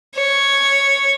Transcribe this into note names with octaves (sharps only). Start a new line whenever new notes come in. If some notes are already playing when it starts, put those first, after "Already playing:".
C#5